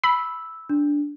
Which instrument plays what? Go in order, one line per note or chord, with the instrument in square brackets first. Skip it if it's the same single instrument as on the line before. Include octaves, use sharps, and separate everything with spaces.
[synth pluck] B5 [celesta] E6
[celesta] D4